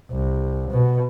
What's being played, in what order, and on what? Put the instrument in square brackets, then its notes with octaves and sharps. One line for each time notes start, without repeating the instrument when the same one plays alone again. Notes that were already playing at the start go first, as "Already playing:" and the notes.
[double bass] C2
B2